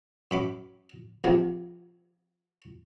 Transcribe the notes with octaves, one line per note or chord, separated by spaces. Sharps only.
F#2 B5 D6
A#1 C3 F3